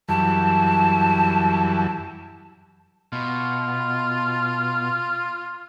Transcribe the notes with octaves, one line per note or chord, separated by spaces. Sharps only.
F#2 E3 G3 A5
B2 F4